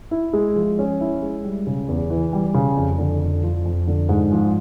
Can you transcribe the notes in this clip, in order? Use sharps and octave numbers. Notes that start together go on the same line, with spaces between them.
E4
G#3
F3
C#4
E4
G#3
G3
C#3
E2
E3
G3
C#3
F2
D3
F2
F3
F2
D3
G#2
F3